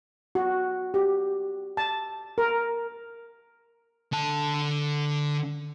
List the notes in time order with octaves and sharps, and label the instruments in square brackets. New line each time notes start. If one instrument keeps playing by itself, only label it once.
[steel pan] F#4
G4
A5
A#4
[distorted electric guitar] D3 A5